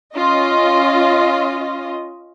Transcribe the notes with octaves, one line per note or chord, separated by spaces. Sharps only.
C#4 F4 D#5